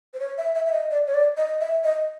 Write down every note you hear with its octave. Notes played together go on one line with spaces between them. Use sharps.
C5
C#5
E5
E5
E5
D#5
D5
C#5
D5
D#5
E5
D#5